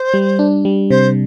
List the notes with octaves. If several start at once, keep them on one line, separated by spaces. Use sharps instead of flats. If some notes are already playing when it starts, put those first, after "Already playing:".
Already playing: C5
G3
D4
G3
C3 C5